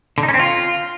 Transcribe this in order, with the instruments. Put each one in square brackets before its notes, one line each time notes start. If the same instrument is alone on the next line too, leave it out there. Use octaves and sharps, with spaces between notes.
[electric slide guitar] D3
D#4
C#4
C4
F4